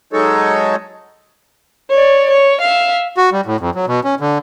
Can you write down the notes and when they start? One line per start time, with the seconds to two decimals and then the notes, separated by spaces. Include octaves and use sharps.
0.13 F#3 G#3 D#4 A4 C#5
1.90 C#5 D5
2.30 C#5
2.61 E5 F5
3.17 F#4
3.32 G3
3.46 A2
3.60 F2
3.75 F#3
3.87 B2
4.04 C#4
4.20 D3